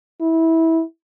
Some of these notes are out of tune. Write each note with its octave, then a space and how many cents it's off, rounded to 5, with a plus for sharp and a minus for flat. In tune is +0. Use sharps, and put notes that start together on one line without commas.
E4 -20